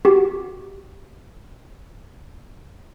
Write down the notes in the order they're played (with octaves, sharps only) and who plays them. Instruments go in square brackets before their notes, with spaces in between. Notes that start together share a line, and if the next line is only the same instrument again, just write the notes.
[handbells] F#4 G4